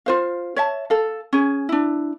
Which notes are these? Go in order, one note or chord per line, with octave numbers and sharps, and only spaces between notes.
F4 C5 F5
C#5 E5 A5
A4 F5
C#4 G#4
D4 E4